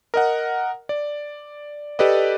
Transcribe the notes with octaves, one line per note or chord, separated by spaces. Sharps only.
A#4 D#5 F#5
D5
G4 A4 B4 D5 D#5